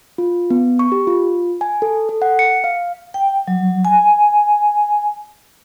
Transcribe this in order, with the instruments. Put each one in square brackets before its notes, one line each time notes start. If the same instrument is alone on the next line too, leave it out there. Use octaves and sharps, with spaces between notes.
[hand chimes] F4
B3
C#6
G4
F4
G#5
A4
A4
F#5
C#7
F5
[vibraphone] G5
F#3
G#5